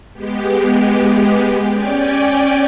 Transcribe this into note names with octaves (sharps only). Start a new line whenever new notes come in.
G#3 B3 G4
C#4 D5 G5 G#5